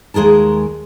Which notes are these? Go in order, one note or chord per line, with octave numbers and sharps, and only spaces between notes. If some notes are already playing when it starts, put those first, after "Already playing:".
D#2 G#3 G#4 A#4 A5